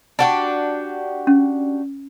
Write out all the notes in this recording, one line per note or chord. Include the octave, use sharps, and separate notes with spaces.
D4 F#4 G4
C#4